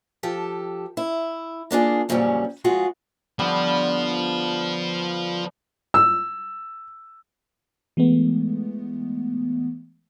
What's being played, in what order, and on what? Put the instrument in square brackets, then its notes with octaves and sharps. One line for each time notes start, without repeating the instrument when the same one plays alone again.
[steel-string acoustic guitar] F3 G4 A4
E4
A#3 D4 F4 G#4
F2 A#2 C#3 F#3 G3 C#4
F3 G#3 F4 F#4 G#4
[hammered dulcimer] D3 G3 B3 [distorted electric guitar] F3
[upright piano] E6
[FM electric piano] E3 G#3 A3 B3